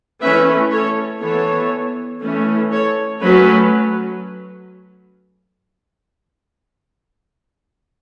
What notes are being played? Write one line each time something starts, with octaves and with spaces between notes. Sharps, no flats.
E3 A3 C#4 B4 E5
A4 C#5
E3 B3 A4 C#5
E3 A3 C#4
A4 C#5
F#3 A3 C#4 F#4 B4